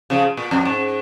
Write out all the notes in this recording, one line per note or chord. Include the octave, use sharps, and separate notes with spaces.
C#3 F3
A#2
F2
G#2